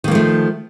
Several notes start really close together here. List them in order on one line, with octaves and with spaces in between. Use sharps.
D#3 A#3 F3 A3